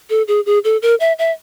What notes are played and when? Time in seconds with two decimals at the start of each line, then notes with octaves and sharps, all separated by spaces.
0.10 A4
0.28 G#4
0.46 G#4
0.64 A4
0.82 A#4
1.00 E5
1.19 E5